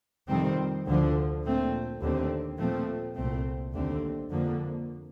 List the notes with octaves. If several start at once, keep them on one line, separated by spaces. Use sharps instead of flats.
F2 C3 D#3 G3 C4
D2 D3 F3
A#2 A3 C4
D#2 D3 A3 C4
A#2 F3 A3 C4
C2 A#2 A3 C4
D#2 D3 A3 C4
F2 D3 F3 A#3